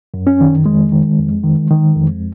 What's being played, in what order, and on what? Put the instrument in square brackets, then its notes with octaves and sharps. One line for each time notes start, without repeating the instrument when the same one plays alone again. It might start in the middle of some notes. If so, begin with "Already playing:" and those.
[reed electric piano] F#2
C#4
D#3
F2 G#3
D#3
F2
D#3
D#3
F2